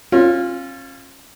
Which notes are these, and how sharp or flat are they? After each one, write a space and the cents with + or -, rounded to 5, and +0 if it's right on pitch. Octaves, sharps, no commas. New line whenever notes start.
C#4 -35 F4 +0